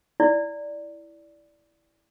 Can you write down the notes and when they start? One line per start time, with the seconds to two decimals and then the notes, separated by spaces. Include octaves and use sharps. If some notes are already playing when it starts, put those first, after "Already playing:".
0.20 E4 D5